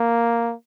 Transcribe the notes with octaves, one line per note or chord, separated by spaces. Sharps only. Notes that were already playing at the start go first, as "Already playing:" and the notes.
Already playing: A#3